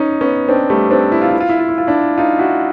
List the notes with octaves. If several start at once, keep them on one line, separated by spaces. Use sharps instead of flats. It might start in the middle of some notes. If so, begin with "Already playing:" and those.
Already playing: C#4 D#4
B3 C#4
C4 D4
G3 A3
C4 D4
E4
F4
E4
F4
E4
F4
E4
F4
D4 E4
D#4 F4
E4 F#4